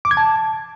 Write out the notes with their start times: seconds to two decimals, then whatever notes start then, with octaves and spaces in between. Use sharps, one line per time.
0.05 D6
0.11 G#6
0.17 A5